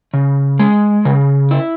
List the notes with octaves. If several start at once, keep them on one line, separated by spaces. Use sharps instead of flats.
C#3
G#3
C#3
E4